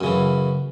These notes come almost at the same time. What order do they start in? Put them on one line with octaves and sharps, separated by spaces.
F#2 C#3 E3